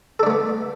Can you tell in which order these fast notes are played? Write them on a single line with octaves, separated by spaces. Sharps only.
A4 D4 A3 B3